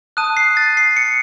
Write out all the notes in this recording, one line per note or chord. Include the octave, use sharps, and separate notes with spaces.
A5 D#6 F#6 D#7
C7
A6
C7
C#7